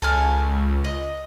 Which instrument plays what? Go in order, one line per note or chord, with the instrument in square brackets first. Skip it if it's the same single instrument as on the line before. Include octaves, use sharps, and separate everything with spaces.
[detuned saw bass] C#2 [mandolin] A4 G#5 F6
[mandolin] D#5